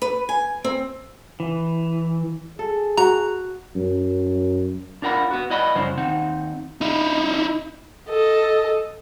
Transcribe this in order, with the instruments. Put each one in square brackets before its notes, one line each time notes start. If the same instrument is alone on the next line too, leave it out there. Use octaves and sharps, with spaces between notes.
[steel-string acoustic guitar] B4
G#5
C4
[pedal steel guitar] E3
[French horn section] G#4 [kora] A4
[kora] F#4 [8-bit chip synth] A#5
[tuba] F#2
[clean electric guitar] D4 F4 A#4 F#5 B5
B3 F#4
E4 B4 D5 D#5 F#5 B5
C2 F#2 C#3 F3 D4 C5
D#2 C4 D#4 F#5
[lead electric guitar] D#4 E4
[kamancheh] A4 D#5